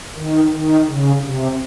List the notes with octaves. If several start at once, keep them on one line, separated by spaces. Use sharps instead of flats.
D#3
D#3
C#3
C3